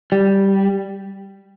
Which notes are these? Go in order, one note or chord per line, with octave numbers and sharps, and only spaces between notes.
G3